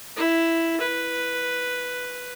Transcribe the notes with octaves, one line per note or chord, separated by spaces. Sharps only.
E4
B4